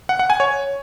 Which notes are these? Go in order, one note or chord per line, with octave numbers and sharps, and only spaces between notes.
F#5
F#5
G#5
C#5